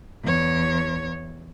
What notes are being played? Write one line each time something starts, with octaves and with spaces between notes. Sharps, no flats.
E2 C#5